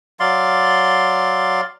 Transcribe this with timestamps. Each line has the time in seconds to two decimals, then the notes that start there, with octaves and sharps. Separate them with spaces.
0.20 F#3 D5 F5 C6